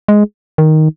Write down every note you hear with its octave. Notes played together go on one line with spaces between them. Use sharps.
G#3
D#3